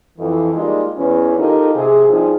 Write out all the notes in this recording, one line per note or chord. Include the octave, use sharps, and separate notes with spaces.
F2 E3
G3 G#3 A#3 D#4 F4 G4
E2 E3 C#4
D#4 F4 G4 A4 A#4 D#5
C3 G#4
G2 F3 C4 D#4 F4 G#4